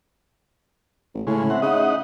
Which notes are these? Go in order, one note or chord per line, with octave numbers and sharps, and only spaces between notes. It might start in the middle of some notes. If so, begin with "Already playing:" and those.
A1
A2 C#3 G#3
C4 E5 F#5
C#3 D#4 D#5 F#5